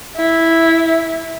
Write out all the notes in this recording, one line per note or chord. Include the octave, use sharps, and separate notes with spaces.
E4